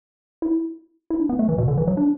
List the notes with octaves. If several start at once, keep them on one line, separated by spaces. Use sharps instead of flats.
E4
E4
D4
B3
A3
E3
B2
D3
E3
F#3
D4